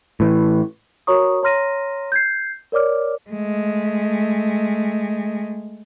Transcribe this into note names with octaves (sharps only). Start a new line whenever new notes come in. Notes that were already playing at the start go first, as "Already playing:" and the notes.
A2 E3
F#4 A#4 C#5 A#5 C#6 D#6
C#5 A#5 C6 F6 A#6 D#7
G6 G#6 C7
A#4 C#5 D5 D6 F6
G#3 A3